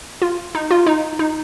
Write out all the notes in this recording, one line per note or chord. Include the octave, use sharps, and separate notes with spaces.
F4
D#4
F4
D#4
D#4